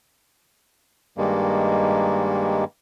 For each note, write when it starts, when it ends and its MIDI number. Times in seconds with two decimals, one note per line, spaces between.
1.18 2.64 43
1.18 2.64 51
1.18 2.64 55
1.18 2.64 56
1.18 2.64 58